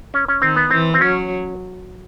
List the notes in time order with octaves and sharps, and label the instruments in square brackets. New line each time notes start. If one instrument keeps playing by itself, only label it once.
[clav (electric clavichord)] C#4
C#4
[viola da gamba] D#3 [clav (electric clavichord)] C4
[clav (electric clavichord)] B3
[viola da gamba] E3 [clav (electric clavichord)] C4
[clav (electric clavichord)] C4
[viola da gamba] F#3 [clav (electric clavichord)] C#4